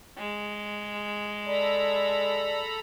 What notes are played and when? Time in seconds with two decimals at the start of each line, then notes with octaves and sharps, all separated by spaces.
0.18 G#3
1.47 A4 D5 A#5 B5